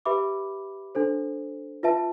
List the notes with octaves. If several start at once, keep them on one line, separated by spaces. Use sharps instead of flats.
G4 B4 E5 B5 D6
D4 A4 C5
F4 B4 E5 A5